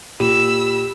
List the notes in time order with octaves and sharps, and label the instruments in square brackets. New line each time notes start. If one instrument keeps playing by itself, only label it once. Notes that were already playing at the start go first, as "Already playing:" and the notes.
[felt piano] A#2 [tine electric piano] G4 [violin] B5 E6